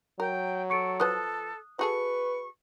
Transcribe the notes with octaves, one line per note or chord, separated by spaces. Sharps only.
F#3 A#4 G5
A4 C#6 C#7 D7
F3 A4 B4 A5 D#6 F#6
F#4 G#4 A4 B4 C#6